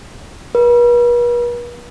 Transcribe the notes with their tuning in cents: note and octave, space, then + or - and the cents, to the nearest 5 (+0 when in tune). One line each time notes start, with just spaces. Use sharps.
B4 -45